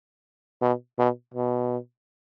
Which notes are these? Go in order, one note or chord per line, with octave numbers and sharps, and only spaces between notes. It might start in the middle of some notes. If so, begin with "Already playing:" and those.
B2
B2
B2